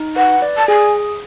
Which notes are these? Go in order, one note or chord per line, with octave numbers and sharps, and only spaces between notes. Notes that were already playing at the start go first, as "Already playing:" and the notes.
Already playing: D#4
B4 F#5
D5
A5
G#4 G#5